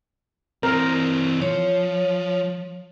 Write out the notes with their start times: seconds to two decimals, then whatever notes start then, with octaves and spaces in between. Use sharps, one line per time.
0.63 E3 C4 A#4
1.42 F3 C#5